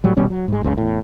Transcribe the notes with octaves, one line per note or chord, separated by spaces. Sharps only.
A2 F#3 G3
D#1 B2 G3 C#4
F#3
G#2 G#3
F#1 C#2 A#2 C#3
E2 A2